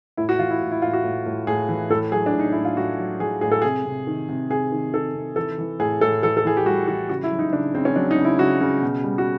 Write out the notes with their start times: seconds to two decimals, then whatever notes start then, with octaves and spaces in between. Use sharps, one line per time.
0.17 A2 E4
0.29 F#4
0.39 E3 F4
0.50 E4
0.61 A2
0.72 E4
0.82 A2 F4
0.93 F#4
1.04 A2
1.26 A2
1.47 A2 G#4
1.69 E3
1.90 A2 A4
2.12 F#3 G#4
2.26 D4
2.33 A2
2.39 D#4
2.52 A2 E4
2.65 F4
2.77 A2 F#4
2.99 F#3
3.20 F#3 G#4
3.41 A2 G#4
3.52 A4
3.62 C3 G#4
3.86 C3
4.07 D#3
4.29 C3
4.50 C3 G#4
4.72 D#3
4.93 D#3 A4
5.15 C3
5.36 E3 A4
5.58 E3
5.79 A2 G#4
6.01 A2 A4
6.23 E3 A4
6.37 A4
6.45 E3 G#4
6.57 G4
6.66 G3 F#4
6.88 E3 F#4
7.09 C#3 F#4
7.24 E4
7.31 F#3
7.39 D#4
7.53 C#3 D4
7.74 C#3 C4
7.85 C#4
7.96 F#3 D4
8.11 D#4
8.18 C#3
8.25 E4
8.39 C#3 F#4
8.61 C#3
8.82 B2
9.04 G3
9.18 F#4